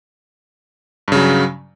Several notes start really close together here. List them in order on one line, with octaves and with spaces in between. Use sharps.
G2 C#3 F#3